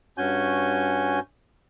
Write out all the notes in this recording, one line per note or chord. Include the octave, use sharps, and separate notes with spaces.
G2 C#4 F#4 G#5 G6